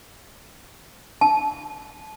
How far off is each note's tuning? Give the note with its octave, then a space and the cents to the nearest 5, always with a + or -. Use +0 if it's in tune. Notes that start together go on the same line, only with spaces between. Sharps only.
A5 -30